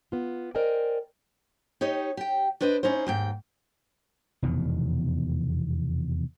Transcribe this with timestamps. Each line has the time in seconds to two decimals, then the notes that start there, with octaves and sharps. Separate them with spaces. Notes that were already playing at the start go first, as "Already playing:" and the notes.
0.12 B3 F4
0.55 A#4 C5 D5 D#5 G5 G#5
1.81 D#4 G4 C#5 D#5
2.17 G4 G5
2.61 D4 B4 C5 D5 D#5
2.83 C#4 D#4 E4 C5
3.07 D#2 G#2 G5
4.42 F1 E2 B2 D#3